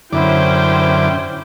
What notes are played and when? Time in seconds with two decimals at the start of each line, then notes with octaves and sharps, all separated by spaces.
0.13 F#2 D3 C#4 E4 C5 G5 D6